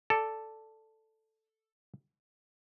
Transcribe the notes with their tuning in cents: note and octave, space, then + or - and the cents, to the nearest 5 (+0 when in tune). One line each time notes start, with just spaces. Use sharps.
A4 +0 D5 +0